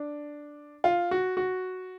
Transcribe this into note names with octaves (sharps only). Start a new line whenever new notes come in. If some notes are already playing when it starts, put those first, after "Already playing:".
Already playing: D4
F4
F#4
F#4